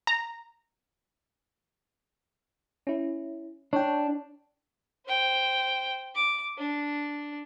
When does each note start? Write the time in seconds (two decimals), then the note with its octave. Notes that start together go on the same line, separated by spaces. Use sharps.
0.07 A#5
2.87 C#4 E4
3.73 D4 C#5 G5
5.06 C5 G5
6.15 D6
6.58 D4